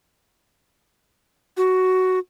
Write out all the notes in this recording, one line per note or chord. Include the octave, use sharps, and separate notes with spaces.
F#4